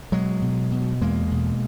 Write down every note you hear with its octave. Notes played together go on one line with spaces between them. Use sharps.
B2 F#3 G#3
B2
B2
E2 G#3 A#3
B2